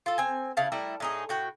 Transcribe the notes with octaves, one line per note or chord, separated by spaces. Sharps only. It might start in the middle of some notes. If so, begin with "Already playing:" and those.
F4 A4
C4 G#5
C#3 E4 F5 A5
G3 A3 E4 A#4
A2 D#4 G#4
A2 F#4 G5